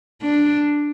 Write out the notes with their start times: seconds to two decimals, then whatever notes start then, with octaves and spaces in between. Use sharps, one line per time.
0.22 D4